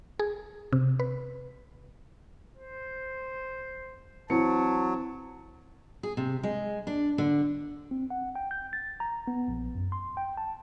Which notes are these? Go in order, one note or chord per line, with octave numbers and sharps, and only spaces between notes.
G#4
C3
B4
C5
E3 F#3 C4 A5 C#7
G#4
C3
G#3
D4
D3
C4
F#5
G5
G6
A6
A#5
B3
A#1
F#2
C6
G5
A5